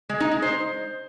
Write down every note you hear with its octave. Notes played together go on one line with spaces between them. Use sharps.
G#3
D#4
G#3
C5